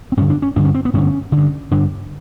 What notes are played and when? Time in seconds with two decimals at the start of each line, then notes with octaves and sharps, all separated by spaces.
0.12 C4
0.17 G2 C#4
0.22 D3
0.30 D4
0.42 C#4
0.56 G2 D4
0.59 D3
0.65 C#4
0.74 C4
0.85 B3
0.94 G2 D3 C#4
1.32 G2 D3
1.71 G2 D3 D4